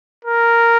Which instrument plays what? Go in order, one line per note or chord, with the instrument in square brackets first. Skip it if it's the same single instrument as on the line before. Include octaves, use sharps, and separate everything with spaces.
[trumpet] A#4